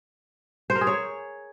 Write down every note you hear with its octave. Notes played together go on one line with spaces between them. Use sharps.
C5
A#4
G#4
C#5